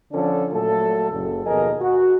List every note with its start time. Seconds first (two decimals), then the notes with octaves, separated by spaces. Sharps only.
0.12 D3 F3 C#4 D4 A4 D5
0.52 A#2 F#3 A3 A4
1.12 F#1
1.46 D#2 B2 F3 G#4 A#4 D#5
1.81 F#4